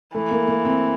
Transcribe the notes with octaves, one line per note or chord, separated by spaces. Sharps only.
E3 A3
A#3
A#3
C4